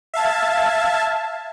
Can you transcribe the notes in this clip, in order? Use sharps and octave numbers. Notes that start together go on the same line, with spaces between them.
E5 F5 A5 G#6